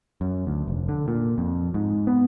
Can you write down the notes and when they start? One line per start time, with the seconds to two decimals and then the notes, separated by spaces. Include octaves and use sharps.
0.21 F#2
0.47 D2
0.68 F1
0.89 D3
1.08 A#2
1.38 F2
1.74 G#2
2.07 B3